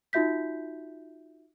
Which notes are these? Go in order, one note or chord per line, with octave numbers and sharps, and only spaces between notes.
D#4 F4 F#4 E5 G6 B6